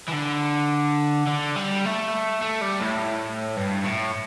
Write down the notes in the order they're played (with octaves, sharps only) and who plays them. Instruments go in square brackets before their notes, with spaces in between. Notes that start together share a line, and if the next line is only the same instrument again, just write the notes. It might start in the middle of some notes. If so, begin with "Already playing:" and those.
[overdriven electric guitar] E3
D3
D3
G3
A3
A3
G3
A2
G2
A2